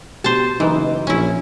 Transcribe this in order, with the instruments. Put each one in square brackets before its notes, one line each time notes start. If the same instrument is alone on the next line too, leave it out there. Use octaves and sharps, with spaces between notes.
[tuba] B2 [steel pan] G4 [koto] C5 A5
[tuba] F#1 [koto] E3 [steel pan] D#4 B4
[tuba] A#1 [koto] C#4 E4